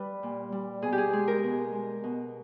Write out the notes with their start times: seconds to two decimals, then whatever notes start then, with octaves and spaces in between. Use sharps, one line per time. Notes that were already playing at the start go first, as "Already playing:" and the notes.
Already playing: G3 B4
0.23 A#2
0.52 G3
0.82 B2 G#4
0.93 G4
0.98 G#4
1.13 G#3 G#4
1.28 A#4
1.44 B2
1.72 G#3
2.04 B2